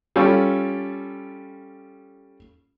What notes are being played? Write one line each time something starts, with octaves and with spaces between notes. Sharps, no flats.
G3 C#4 F4 A4